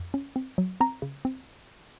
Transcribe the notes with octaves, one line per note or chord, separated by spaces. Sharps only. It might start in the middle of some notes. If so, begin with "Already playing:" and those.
Already playing: F2
C#4
C4
F#3
C4 A#5
C#3
C4